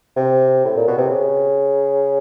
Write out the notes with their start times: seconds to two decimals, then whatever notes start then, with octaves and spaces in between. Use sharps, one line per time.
0.17 C3
0.65 A2
0.76 A#2
0.88 B2
0.98 C3
1.09 C#3